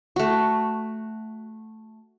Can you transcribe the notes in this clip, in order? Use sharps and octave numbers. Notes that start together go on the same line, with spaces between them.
A3 F#4